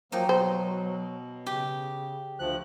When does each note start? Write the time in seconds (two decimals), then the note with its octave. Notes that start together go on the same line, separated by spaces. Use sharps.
0.12 F3 F#3 A#3 D#4 G5
0.29 B2 C5
1.47 C#3 G4
2.39 D2 F3 F#6